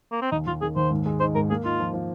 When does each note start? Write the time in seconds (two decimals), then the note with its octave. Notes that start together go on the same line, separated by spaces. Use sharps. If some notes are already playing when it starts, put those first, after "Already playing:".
0.12 A#3
0.22 C4
0.32 D#2 D#4
0.47 D#2 F4
0.62 D#3 G#4
0.76 D#2 C5
0.91 G#2
1.06 G#3
1.20 D#4 C5
1.35 G#2 A#4
1.50 A#3 G#4
1.65 D#4 F4
1.80 F3
1.93 F3